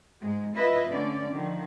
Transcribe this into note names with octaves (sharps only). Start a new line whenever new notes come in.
G#2 G#3
E4 F4 B4 D#5 E5
D3 A3 C#4 D5
D3 D#3 F3